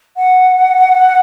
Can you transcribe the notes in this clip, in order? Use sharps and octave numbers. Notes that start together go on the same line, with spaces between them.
F#5